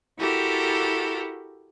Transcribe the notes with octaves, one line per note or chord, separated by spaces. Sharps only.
E4 F#4 G4 A4 A#4